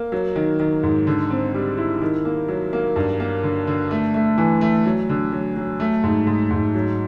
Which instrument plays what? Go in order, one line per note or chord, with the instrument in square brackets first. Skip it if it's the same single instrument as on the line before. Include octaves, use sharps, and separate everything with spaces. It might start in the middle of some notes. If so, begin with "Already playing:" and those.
Already playing: [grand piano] A#3
F#3
D#3
D#3
G#2
D3
C4
G3
E4
D#3
A#3
F#3
A#3
G2
A#3
D3
D3
A3
A3
E3
A3
F#3
D3
F#3
F#3
A3
G#2
G#2
G#2
F#3